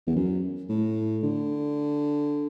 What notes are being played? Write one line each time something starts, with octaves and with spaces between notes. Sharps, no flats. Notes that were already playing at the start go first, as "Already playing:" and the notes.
E2
F#2
A2
D3